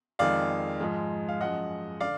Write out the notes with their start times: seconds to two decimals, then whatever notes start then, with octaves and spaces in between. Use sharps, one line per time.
0.19 F2 D#3 G#3 D5 F5
0.80 G#2 F3 G#3
1.29 F5
1.40 F#2 F3 G#3 D#5 F#5
2.00 D3 D5 F5